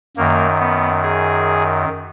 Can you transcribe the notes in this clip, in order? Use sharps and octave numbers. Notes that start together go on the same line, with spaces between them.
F#2 D#3 A#3
B3
G#4